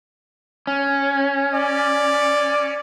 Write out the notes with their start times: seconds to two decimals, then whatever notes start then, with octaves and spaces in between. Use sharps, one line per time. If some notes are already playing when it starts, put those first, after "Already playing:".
0.67 C#4
1.54 D5